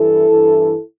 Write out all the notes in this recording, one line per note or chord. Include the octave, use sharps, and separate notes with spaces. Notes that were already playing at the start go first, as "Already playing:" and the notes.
Already playing: G2 E3 E4 A4
G2 E3